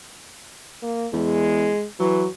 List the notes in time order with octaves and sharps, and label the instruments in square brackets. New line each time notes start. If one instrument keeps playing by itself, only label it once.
[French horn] A#3
[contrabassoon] E2 [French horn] G#3
[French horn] E3 [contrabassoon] F#3